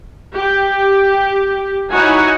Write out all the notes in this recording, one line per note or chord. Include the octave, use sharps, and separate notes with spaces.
G4
D#4 E4 F#4 C#5 F#5 G#5